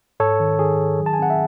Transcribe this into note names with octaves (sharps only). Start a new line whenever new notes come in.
G#2 A4 C#5
D#3
D#3 G#4
D#3
F#3
A5
G#5
C4 F#5
E5